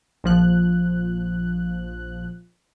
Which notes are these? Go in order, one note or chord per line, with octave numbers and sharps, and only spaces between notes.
A#1 F3 F#6